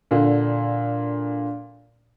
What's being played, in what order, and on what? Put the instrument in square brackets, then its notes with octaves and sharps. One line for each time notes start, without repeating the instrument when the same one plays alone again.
[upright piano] A#2 D3